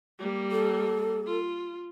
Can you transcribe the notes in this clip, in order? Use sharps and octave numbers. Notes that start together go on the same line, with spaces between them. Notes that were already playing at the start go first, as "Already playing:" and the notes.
G3 A#3
A4
F4